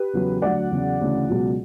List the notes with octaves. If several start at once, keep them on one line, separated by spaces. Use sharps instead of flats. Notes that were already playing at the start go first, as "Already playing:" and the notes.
Already playing: G4 B4
E2 C#3 F#3
D2 D3 F#3 D5 F#5
E2 C#3 F#3
D2 C#3 E3
C#2 B2 F#3